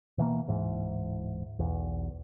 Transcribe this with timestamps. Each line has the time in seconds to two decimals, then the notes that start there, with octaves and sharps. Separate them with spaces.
0.18 B2 E3 A3 A#3
0.47 D1 G#2 E3
1.59 B1 E2